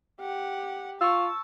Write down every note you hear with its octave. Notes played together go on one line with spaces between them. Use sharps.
G4 F#5
F4 A5 C#6 E6